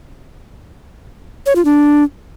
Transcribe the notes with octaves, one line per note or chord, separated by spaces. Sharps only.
C#5
F4
D4